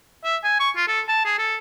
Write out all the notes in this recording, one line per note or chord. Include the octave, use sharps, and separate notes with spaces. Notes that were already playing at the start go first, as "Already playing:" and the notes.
E5
G#5
C#6
F4
A4
A5
G#4
A4